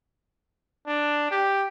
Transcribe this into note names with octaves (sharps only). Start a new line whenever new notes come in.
D4
G4